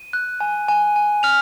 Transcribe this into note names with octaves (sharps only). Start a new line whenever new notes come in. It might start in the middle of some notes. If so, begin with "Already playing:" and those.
Already playing: D#7
F#6
G#5
G#5
G#5
F6 F7